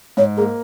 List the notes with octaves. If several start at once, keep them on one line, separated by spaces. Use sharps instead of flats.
G#2 C#5
A#3 G#4